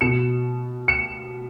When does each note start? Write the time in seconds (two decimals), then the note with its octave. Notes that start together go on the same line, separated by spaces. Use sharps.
0.01 B2 C#7 E7
0.88 C#7 E7